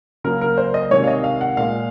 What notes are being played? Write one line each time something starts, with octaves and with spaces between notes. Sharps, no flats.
C#3 F#3 A#3 A#4
A#4
C5
D#5
C3 D#3 G#3 C#5
F5
D#5
F5
F#5
A#2 G#3 F5